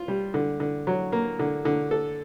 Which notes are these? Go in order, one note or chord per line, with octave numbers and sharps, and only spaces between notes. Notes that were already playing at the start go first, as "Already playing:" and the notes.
Already playing: F4
G3
D3
D3
F#3
A#3
D3
D3
A4